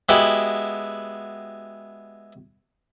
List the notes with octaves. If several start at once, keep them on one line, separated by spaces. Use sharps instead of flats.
G#3 B3 E4 F#4 G4